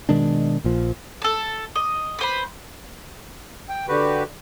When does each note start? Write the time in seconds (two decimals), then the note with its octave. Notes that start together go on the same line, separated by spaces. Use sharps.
0.09 B2 D#3 G#3 D4
0.64 A#1 A#2 F3
1.22 A4 A5
1.76 D#5
2.19 B4 C5 B5
3.69 G5
3.89 D3 F#4 G4 B4